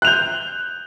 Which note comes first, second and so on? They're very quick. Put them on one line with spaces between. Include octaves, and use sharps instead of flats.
F#6 F7 G6